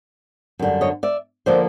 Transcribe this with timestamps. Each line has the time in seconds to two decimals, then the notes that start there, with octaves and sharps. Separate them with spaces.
0.59 F#2 D3 G3
0.81 C#5 D#5
1.03 D5 E5
1.46 D3 F3 A#3 C5 D5